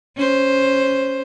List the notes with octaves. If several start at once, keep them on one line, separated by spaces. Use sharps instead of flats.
C#4 C5